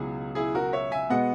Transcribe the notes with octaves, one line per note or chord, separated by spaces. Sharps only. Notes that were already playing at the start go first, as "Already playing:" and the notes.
Already playing: C#2 B2 F#3 E4 G#4
E4 G#4
F#4 A#4
C#5 E5
E5 G#5
B2 G#3 B3 D#5 F#5